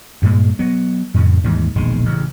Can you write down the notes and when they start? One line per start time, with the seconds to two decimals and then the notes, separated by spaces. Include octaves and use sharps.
0.22 D2 G2 A#2 G#3
0.59 F#3 B3
1.14 F2 A2 C#3
1.44 D#2 G#2 E3 G3
1.75 E1 A#1 D#3 G#3
2.06 A1 C#3